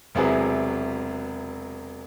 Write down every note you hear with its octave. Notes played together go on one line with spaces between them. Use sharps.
E1 C3 F#3 E4 G#4 B4